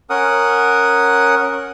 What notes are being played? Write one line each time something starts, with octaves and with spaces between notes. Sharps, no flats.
C#4 A#4 F#5 D#6